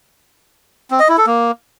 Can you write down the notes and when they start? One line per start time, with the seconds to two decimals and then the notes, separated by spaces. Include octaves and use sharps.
0.91 C4
1.00 D#5
1.09 E4
1.18 A4
1.27 A#3